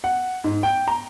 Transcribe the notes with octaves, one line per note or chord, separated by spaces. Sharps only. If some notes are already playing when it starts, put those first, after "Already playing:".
F#5
G#2
G5
A#5